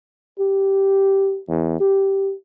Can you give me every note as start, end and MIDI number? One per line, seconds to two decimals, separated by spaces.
0.39 1.39 67
1.48 1.77 40
1.80 2.33 67